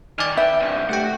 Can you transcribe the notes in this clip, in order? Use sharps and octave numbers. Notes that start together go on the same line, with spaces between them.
D#3 D5 G#5 F6
B4 E5 G5
C2 G2
A3 F#4 G4 F#5 G5